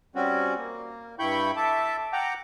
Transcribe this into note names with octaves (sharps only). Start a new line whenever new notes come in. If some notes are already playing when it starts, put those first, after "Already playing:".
G3 C4 C#4 F#4
A#3
G2 E4 G5 B5 C#6 G6
A4 E5 A5 D6
F#5 G5 A#5 D6